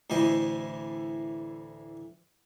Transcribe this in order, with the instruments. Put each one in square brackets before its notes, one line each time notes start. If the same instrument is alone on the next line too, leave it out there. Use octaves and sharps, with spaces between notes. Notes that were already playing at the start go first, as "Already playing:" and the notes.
[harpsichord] D2 A2 E3 C5 D#5